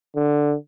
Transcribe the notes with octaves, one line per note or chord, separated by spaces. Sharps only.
D3